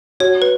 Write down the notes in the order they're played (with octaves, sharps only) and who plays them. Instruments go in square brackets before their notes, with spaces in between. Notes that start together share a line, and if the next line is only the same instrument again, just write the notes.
[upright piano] F#4 [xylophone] C#5
[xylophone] B4